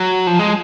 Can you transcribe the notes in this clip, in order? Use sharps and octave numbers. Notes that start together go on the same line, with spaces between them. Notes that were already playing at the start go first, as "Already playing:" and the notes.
Already playing: F#3
F3
G#3